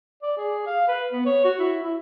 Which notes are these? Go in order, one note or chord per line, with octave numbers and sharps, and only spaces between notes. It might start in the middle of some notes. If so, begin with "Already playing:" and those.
D5
G#4
F5
B4
B3
C#5
F#4
E4
E4